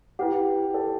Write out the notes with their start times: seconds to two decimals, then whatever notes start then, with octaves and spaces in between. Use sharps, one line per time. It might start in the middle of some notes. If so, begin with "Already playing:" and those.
0.19 E4 G4 B4 F#5
0.74 A4